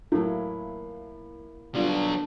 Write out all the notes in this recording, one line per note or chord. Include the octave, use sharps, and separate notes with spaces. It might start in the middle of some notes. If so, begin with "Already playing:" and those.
A2 F#3 A#3 E4
D3 F#3 G3 B3 D4 F4